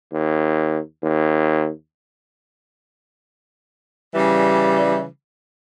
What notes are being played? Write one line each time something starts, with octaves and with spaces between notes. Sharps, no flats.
D#2
D#2
C#3 E3 G3